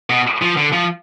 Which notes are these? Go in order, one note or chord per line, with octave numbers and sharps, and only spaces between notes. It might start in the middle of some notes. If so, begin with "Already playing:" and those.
B2
F3
D3
F3